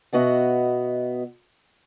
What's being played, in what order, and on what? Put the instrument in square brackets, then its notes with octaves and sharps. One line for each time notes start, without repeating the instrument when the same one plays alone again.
[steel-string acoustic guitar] B2 B3 F#4 D#5 E5